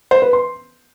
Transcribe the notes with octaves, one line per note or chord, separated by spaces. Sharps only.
C5
B4
C6